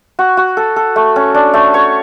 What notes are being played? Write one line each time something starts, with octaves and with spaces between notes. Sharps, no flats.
F#4
F#4
A4
A4
A3
C#4
D4
A3
C#5